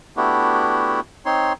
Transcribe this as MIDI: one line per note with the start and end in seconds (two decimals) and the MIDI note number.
0.17 1.00 57
0.17 1.00 59
0.17 1.00 62
0.17 1.00 64
0.17 1.00 66
0.17 1.00 67
1.26 1.53 60
1.26 1.53 63
1.26 1.53 73
1.26 1.53 84